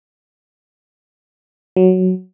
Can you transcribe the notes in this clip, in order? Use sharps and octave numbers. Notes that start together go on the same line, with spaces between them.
F#3